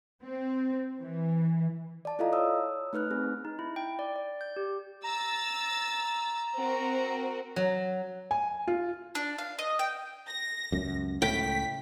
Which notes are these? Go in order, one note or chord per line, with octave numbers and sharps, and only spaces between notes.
C4
E3
D5 A5
E4 F4 A4 D#5 F5 A#5
C#5 D#6 E6
A3 D#4 B4 F6 F#6
C4 G#4
D#4
E4
G5
D5
D5
G6
G4
A#5 E6 A6
C4 F#4 A#4
F#3
G#5
F4
D4
F5
D#5
G5
A#6
C#2 F#2
C#2 A2 G5 B6